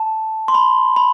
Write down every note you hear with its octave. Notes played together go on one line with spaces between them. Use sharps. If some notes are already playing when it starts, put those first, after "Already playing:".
Already playing: A5
C6
B5
B5